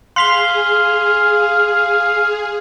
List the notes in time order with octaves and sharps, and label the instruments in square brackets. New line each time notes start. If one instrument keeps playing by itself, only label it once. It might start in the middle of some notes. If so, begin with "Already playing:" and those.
[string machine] G#4 [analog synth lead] F5 [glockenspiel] C6 B6 G7